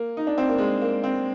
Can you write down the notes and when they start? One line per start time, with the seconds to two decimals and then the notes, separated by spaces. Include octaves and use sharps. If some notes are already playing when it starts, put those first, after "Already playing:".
Already playing: A#3
0.17 D#4
0.27 D4
0.38 C4
0.49 A#3
0.58 G#3
0.82 A#3
1.04 C4